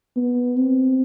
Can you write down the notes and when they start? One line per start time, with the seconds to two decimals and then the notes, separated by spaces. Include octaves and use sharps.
0.16 B3
0.56 C4